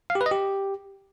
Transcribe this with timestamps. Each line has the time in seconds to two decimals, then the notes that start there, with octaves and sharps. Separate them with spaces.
0.10 F5
0.15 G4
0.21 B4
0.26 D#5
0.31 G4